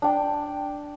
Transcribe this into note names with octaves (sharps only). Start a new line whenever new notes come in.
D4 G5